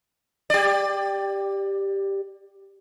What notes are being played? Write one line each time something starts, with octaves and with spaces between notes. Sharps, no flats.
G4 D5